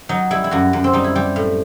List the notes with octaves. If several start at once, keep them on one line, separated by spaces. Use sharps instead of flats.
F#3 D#4
G3 E4
E4
F#2 F#4
F#2
C4
G3 D#4
E4
G3 G4
A2